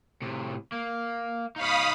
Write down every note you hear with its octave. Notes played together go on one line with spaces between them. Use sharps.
A2 C3
A#3
D#4 C#5 F5 B5 D#6